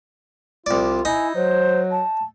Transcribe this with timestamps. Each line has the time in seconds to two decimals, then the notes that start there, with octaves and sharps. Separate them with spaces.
0.66 C2 F4 D5
1.05 D#4 E4 G#5
1.35 F#3 C5
1.91 A5